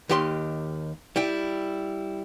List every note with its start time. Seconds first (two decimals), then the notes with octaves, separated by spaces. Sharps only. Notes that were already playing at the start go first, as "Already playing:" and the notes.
0.09 D#2 D#3 G4 D#5 C6
1.16 G3 E4 G5